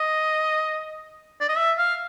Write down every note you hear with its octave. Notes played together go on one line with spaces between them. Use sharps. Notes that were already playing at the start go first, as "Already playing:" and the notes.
Already playing: D#5
D5
D#5
E5
F5